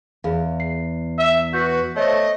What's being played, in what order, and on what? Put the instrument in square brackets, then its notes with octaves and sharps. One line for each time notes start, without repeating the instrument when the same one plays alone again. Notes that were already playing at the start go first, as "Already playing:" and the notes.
[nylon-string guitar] E2 [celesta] G#4 F5
[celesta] C7
[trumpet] E5 [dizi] E6
[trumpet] F#4 [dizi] B4 [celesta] G6 B6
[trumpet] A3 [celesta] C5 C#5 [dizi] D#5